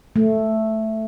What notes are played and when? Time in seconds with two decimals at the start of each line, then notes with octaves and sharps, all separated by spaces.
0.16 A3